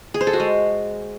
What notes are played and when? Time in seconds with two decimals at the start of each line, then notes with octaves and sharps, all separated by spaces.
0.14 G#4
0.21 C5
0.27 A4
0.33 F#4
0.40 G#3